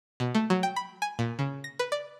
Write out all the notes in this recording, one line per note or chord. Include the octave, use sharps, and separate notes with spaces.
B2
A3
F#3
G5
B5
G#5
A#2
C#3
A#6
B4
D5